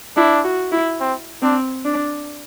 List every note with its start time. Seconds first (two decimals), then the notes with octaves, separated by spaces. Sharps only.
0.16 D4 E4
0.44 F#4
0.72 E4
1.00 C4
1.42 C4 D4
1.85 D4